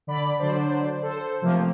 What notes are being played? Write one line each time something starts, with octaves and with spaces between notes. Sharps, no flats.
D3 D5 B5 D6
D3 F#3 D4 C5 D5
A4 C5
C3 F3 A3 A#3 C4